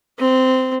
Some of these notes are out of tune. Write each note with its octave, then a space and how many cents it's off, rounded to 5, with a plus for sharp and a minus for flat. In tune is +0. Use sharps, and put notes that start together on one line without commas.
C4 -15